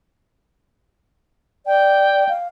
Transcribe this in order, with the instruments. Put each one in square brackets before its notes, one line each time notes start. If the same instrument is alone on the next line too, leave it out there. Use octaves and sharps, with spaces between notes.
[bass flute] D5 [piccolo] G5
[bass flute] F5